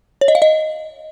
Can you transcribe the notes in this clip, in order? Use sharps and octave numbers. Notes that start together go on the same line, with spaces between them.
C#5
D#5
F5
D#5